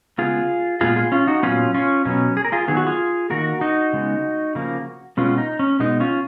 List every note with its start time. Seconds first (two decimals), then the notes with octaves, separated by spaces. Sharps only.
0.18 C#3 G#3 B3 F4 G#4
0.81 A#2 G#3 B3 F4 G#4
0.96 F4 G#4
1.12 C#4 F4
1.27 D#4 F#4
1.43 A#2 F#3 B3 C#4 F4
1.74 C#4 F4
2.05 B2 F#3 B3 C#4
2.37 G#4
2.44 A#4
2.52 F4 G#4
2.68 D#3 F#3 B3 G#4
2.77 F#4
2.86 F4 G#4
3.30 D#3 A#3 F#4 A#4
3.61 D#4 F#4
3.93 C#3 G#3 B3
4.55 C#3 F3 A#3
5.17 B2 G#3 B3 C#4 F4
5.38 D#4
5.59 C#4
5.79 B2 G#3 B3 D#4
6.00 C#4 F4